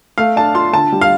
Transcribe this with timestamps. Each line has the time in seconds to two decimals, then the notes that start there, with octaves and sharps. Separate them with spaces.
0.18 A3 F5
0.36 D4 A5
0.55 F4 C6
0.73 D3 A5
0.92 G3
1.01 F5